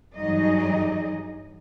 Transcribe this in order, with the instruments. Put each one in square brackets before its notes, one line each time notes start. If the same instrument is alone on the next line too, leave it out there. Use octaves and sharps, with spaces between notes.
[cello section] G2 E3 F#3 D#4 G#4 D#5